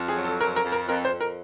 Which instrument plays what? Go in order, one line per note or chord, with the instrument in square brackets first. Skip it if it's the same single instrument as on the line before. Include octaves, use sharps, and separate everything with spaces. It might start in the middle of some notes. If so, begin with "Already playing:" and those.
Already playing: [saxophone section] F2
[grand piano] G#4
[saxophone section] F#3
[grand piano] A4
[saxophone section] F2 [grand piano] A#4
[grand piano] A#4
[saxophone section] F2
[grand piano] A#4
[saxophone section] F2 [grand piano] A#4
[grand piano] C5
[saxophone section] F2
[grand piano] A#4